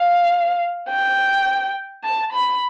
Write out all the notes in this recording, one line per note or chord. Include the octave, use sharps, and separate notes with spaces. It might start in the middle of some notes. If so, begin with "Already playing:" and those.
Already playing: F5
G5
A5
B5